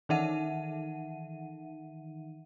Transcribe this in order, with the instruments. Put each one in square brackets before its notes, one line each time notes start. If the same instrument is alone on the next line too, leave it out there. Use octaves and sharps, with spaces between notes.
[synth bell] D#3 E3 D#4 E5 F#5 D#7